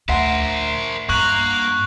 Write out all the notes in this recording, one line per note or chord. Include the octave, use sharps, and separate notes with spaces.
D2 A#4 C5 E5 F#5 C6 B6
G2 A#3 A#5 C#6 F#6 F#7